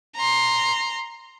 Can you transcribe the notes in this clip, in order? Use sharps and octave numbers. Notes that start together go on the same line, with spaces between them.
A#5 C6